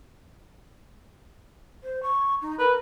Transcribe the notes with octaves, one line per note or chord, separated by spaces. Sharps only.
C5
C#6
D#4
A#4 B4